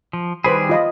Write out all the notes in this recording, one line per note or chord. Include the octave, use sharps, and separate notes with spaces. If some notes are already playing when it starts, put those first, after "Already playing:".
F3
D#3 G3 G#4 B4 C5 B5
F4 D#5 B5